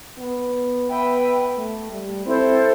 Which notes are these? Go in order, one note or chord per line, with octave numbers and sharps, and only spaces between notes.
B3
B4 E5 G5
A3
G3
C4 E4 A4 C5